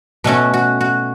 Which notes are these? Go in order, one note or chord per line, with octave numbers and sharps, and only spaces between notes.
B2 A3 C#4 F#4
F#4
F#4